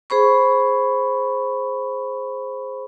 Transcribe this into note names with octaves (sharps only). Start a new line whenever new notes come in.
G#4 C5 B5 C#6